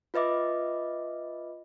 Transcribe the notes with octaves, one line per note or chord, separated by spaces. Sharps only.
F4 B4 D#5 E5 D6